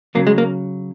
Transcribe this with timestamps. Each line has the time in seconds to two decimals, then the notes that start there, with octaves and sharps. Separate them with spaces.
0.15 C#3 F#3 A#3
0.27 G#3
0.38 A#3